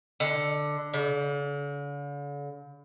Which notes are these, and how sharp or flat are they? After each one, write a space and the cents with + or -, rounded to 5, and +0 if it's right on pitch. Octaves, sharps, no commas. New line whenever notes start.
D3 +5
D3 -45